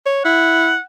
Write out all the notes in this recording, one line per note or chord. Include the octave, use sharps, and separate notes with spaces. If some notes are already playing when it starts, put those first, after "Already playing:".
C#5
E4 F#5